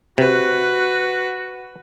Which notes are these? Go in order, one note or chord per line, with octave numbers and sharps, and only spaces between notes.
C3 F#4 B4